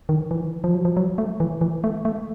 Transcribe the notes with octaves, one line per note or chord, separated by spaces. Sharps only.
D#3
E3
F3
F#3
F3
F#3
A3
E3
E3
A3
A3